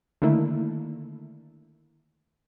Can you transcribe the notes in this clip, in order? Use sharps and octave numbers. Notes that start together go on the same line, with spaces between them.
D3 D#3 A3 A#3 E4